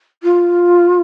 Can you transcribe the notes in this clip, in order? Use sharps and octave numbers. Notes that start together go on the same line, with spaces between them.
F4